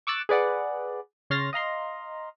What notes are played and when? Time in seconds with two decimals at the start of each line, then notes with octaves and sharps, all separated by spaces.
0.07 C#6 D6 E6 F#6 A6
0.29 G#4 B4 D5 F#5
1.30 C#3 C#5 C6 F6 A6 A#6
1.53 D#5 F5 A#5 C6